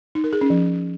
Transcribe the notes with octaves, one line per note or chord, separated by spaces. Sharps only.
D#4
A#4
G#4
C#4
F3